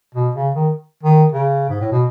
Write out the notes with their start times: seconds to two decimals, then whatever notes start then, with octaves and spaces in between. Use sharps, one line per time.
0.15 B2
0.35 C#3
0.55 D#3
1.03 D#3
1.32 C#3
1.69 G#2
1.81 A2
1.92 B2